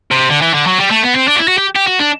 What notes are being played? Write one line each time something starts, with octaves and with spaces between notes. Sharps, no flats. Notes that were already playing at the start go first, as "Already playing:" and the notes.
C3
D3
E3
D3
F#3
G3
A3
B3
C4
D4
F#4
E4
F#4
G4
G4
F#4
D4